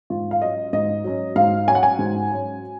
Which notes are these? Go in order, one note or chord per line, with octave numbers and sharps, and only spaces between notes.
G#2 F4
F5
F#3 C#4 D#5
G#2 D#5
F#3 C#4
G#2 F5
F#3 C#4 G#5
F#5
G#5
G#2
F#3 C#4